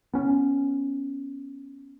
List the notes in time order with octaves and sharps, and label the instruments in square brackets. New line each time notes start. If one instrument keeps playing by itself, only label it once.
[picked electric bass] B3 C#4